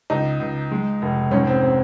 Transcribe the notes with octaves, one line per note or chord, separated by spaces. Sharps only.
C#2 D#4
C#2
G#3
F1
G#2 C#4
C4
C4